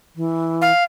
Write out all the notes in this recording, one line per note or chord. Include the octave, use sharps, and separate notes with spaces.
E3
F5